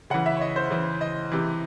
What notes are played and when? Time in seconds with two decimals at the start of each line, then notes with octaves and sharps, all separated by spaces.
0.10 C#3 E3 F#5
0.26 E5
0.37 C#5
0.41 D#5
0.56 C5
0.70 C#3 E3
1.01 D#5
1.31 C3 E3